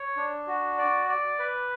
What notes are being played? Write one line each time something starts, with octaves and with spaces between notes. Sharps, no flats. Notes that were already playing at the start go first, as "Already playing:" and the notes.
Already playing: C#5
D4
F#4
D5
D5
B4